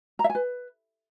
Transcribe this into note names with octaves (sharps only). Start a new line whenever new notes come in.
A#5
E5
G#5
B4